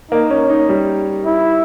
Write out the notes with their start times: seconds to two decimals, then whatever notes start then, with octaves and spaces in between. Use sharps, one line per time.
0.11 A#3 D#4
0.30 C#4
0.50 D#4
0.69 G3
1.26 E4